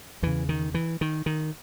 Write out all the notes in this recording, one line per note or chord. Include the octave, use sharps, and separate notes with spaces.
E2 C#3 E3
D#3
E3
D#3
D#3